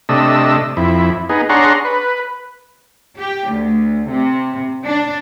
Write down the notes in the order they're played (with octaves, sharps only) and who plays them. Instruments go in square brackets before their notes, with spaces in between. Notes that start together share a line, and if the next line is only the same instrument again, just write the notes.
[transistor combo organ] C3 A3 D4 D#5 E6
F2 E4
B3 D#4 G#4
D4 G#4 C#5 F#5 A#5 C6
B4
[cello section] G4
D2
C3
D4